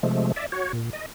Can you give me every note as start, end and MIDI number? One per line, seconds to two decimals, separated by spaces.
0.03 0.32 48
0.03 0.32 53
0.03 0.32 56
0.03 0.32 57
0.36 0.46 74
0.36 0.46 76
0.52 0.72 66
0.52 0.72 73
0.73 0.90 46
0.93 1.06 75